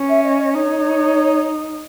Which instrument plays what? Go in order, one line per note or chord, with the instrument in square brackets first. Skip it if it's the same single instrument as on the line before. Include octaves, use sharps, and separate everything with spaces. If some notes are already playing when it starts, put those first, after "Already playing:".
Already playing: [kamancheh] C#4
[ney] E5
D#5
D#5
[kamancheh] D#4 [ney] C#5